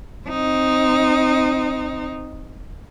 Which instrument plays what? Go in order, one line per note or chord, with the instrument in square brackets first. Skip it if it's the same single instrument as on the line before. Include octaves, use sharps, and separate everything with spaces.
[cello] C4 D#4